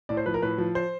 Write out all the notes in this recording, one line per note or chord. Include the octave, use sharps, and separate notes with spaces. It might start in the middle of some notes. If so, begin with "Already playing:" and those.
A2 D5
C5
F3 B4
A#4
A2 B4
F3
C5